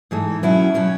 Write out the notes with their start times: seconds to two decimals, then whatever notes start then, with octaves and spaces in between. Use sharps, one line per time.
0.11 G#2 E3 A3
0.43 B2 F#3 C#4 E4
0.74 B2 F#3 C#4